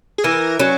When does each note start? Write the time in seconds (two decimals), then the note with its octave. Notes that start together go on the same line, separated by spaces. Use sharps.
0.18 G#4
0.24 E3 A#4
0.60 F#3 C#4